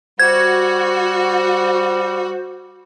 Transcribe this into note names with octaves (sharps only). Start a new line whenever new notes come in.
G3 F#4 C5 G#6